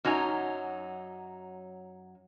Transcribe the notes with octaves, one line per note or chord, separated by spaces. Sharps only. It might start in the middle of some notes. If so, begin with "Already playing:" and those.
F#2 F#3 D#4 G#5